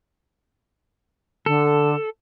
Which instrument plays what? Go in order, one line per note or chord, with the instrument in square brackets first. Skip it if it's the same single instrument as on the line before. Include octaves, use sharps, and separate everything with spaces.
[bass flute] D3 [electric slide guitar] A4